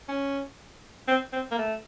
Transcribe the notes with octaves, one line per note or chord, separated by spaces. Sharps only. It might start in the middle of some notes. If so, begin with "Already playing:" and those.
C#4
C4
C4
A#3
A3